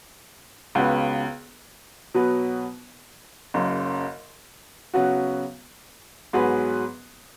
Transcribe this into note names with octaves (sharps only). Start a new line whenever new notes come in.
C#2 C#3 B3 F#4 B4
B2 F#3 B3 F#4 B4
F#1 F#2 C#3
C#3 F#3 B3 F#4
G#2 F#3 B3 G#4 B4